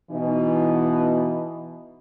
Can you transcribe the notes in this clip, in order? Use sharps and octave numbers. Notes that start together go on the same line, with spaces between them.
B2 E3 D#4